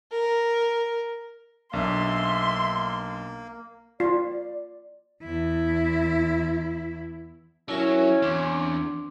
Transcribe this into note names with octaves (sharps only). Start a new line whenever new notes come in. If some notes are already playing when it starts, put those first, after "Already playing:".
A#4
B1 A#3 D4 E5 C6
F4 D5
E2 E4
F#3 C#4 E4 A#4 E5
E2 C4 D4